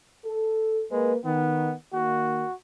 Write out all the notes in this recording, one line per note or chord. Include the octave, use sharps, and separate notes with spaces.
A4
G#3 A#3 B4
D#3 B3
D#3 A#3 F#4